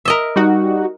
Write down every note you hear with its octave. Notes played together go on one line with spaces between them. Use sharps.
A#4 D#5 E5
G3 D#4 F#4